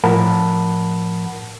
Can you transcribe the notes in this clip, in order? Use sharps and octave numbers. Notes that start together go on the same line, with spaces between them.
A2 F3 A#4 F#5 A5 B5